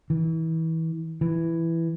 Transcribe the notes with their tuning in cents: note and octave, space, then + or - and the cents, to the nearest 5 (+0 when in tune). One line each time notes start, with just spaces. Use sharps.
E3 -30
E3 +5